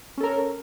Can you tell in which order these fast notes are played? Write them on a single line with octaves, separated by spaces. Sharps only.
C#4 A4 A#4